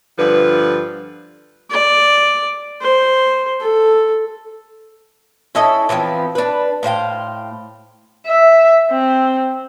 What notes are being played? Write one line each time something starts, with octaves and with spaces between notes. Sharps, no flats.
G2 D3 F3 B4
D5
C5
A4
C#4 E4 A4 D#5
E3 F3 B3 C4
D4 B4
A2 C5 F5 G5
E5
C4